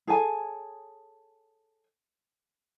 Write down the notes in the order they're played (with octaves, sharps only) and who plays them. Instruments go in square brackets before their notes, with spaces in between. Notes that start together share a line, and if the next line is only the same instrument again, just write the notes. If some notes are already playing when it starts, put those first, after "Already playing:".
[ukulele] G#4 A4 C#5 G#5